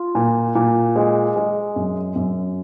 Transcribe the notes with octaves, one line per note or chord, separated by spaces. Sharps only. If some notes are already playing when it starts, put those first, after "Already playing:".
Already playing: F4
A#2
A#2
G#3
G#3
F#2
F#2